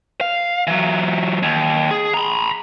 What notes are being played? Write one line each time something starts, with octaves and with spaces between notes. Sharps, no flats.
F5
E3 F#3
D#2
G#4
A#5 B5